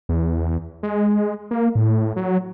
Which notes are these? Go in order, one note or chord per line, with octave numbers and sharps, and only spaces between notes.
E2
G#3
A#3
A2
F#3